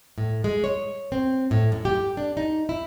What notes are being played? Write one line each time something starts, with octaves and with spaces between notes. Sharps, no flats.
A2
G#3
C#5
C4
A2
F#2
G4
D4
D#4
E4